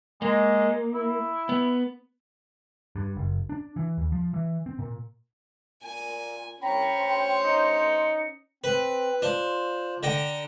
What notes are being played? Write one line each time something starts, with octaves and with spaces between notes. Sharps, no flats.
G#3 A#3
E4
B3
G2
F#1
D4
E3
D#2
F3
E3
C4
A#2
A#2 G#5
C2 C3 C#4 C#5 G5 A#5 B5
D2 C5
D#4 C#7
C4 B4
D4 F4 C5
D3 G5 A#5